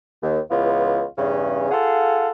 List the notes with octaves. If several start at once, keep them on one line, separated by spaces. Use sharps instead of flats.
D#2
C#2 E3 B3 F4
E2 G2 C#3 C#4
F4 G#4 A4 F5 F#5